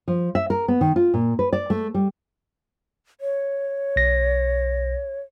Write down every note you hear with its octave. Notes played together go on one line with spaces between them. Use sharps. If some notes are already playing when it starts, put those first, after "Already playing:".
F3
E5
A#4
B3
D#3
F4
A#2
B4
D5
A3
G3
C#5
B1 A#6